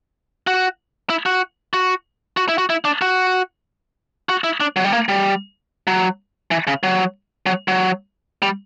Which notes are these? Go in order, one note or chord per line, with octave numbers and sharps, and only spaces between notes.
F#4
E4
F#4
F#4
F#4
E4
F#4
E4
D4
F#4
F#4
E4
D4
F#3
G3
A#3
G3
F#3
E3
C#3
F#3
F#3
F#3
G3